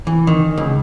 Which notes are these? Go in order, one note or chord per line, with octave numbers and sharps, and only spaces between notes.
E3
D#3
C#2